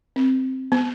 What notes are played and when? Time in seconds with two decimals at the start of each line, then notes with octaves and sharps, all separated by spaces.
0.16 C4
0.72 B3